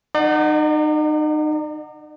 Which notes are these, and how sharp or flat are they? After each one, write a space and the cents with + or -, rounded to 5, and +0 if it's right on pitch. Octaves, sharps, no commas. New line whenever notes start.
D#4 -30 D5 +35 F#5 +0